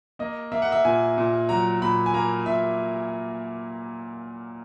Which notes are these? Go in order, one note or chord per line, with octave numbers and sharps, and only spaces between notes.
A#3 D#5
A#3 E5
F#5
E5
A#2 G#5
A#2
F#3 A#5
A#2 B5
G#5
A#3 A#5
A#2 E5